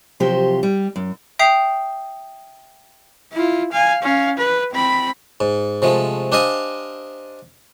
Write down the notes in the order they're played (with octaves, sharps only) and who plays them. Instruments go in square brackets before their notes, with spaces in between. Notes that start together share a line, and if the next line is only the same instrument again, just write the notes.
[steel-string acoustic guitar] C3 F3 F#3 G4 C5
G3
F#2
[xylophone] E5 G5 D#6 G6 C7 F7
[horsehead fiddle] E4 F4
F5 G#5
C#4 F5
B4
C4 B5
[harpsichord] G#2
C3 F3 G#3 A3
D4 G4 C5 D#5 F5 G#5